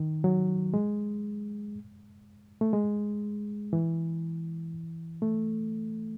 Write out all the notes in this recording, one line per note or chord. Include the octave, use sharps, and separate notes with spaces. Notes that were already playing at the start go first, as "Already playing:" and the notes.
Already playing: D#3
F#3
G#3
A3
G#3
E3
A3